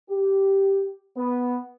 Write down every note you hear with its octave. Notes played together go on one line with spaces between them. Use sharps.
G4
B3